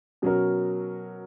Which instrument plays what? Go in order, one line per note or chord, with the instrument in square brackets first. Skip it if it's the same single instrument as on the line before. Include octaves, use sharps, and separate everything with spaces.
[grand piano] B2 F#3 C#4 F#4 A#4